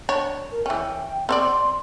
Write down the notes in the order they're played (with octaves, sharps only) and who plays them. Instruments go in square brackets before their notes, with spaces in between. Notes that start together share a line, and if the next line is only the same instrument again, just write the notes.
[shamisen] D4 C#5
[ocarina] A#4
[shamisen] E3 C#4 [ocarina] G5
[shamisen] C4 C#5 D5 [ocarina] C6